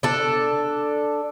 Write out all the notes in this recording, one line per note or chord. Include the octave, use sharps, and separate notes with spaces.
D4 A4